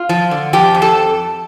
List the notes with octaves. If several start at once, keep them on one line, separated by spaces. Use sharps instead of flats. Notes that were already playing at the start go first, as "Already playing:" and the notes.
Already playing: F4
F3
D3
F3 G4
F2
A4